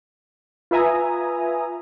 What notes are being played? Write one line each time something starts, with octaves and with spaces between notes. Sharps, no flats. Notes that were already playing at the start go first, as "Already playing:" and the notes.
F4 B4 E5 G#5 A#5 D#6